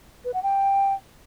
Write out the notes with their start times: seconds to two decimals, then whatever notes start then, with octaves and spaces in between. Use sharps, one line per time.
0.25 B4
0.34 F#5
0.43 G5